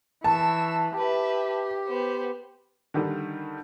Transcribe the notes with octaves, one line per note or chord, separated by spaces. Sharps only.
E3 A5 C#6 E6
G4 B4 E5
B3 C5
D3 D#3 G3